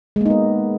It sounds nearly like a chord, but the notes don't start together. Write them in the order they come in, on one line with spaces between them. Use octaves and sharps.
G#3 A#3 D#4 B3